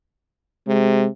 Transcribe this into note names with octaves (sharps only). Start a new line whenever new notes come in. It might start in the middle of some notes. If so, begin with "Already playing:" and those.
C3 G#3